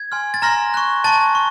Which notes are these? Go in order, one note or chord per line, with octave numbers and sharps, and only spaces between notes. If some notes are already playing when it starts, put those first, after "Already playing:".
Already playing: G#6
G#5 C6 F6
A6
G#5 A#5 C6 F6 A#6
C#6 F#6
A5 C#6 F#6 A6
C#6